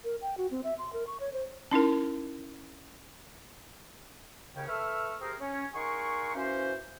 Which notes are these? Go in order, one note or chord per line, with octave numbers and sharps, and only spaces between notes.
A#4
G5
F#4
C4
E5
C6
A#4
C#6
C#5
C5
C#4 D#4 E4 A#4
D#2 C#3 C#4 G5
A4 B4 E5 C#6 E6 F6
G4 G#4 A#4 C5
C#4
D#4 G#4 A#4 F#5 C6 C#6
E3 A#3 C#4 F#4 C5